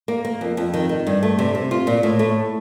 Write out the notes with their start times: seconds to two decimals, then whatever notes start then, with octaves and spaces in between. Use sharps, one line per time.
0.08 A#3
0.25 A#3
0.41 F2
0.57 F2
0.74 D#3
0.89 D#3
1.07 G2
1.23 A3
1.39 C3
1.55 C3
1.71 F4
1.87 A#2
2.03 A2
2.19 A3